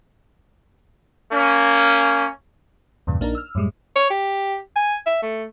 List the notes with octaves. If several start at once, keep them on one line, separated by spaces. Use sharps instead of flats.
A#3 C#4
E2 G2 A#2 C#3
A#1 A#3 D4 D#4 A#4
E6 F6
F#2 A2 G3 G#3
C#5
G4
G#5
E5
A3